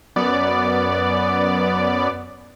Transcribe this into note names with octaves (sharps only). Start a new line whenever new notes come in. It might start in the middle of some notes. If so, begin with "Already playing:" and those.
F#2 B3 D5